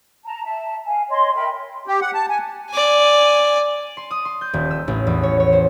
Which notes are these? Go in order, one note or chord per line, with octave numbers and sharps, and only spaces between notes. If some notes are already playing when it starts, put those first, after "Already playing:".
A5 A#5
E5 A5
F5 G#5
C#5 D#5 C6
A#4 E5 G5 B5
G4
F#5
A5
G#5
D5 G#5
C6
D#6
C6
G6
D#1
E6
A1
E2
C#5
C#5
C5